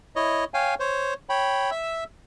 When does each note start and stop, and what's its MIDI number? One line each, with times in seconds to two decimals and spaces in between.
0.16 0.44 64
0.16 0.44 73
0.16 0.44 75
0.54 0.75 73
0.54 0.75 77
0.54 0.75 79
0.54 0.75 80
0.80 1.14 72
0.80 1.14 73
1.29 1.70 73
1.29 1.70 79
1.29 1.70 83
1.71 2.04 76
1.71 2.04 88